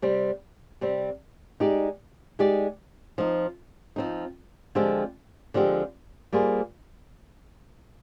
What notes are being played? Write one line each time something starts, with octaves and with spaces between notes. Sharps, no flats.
C3 G3 C4
C3 G3 C4
G#3 D#4 G4 D5
G#3 D#4 G4 D5
F3 C4 D#4
F3 C4 D#4
D3 F3 G#3 C4 G4
D3 F3 G#3 C4 G4
G3 A#3 F4 G#4 C5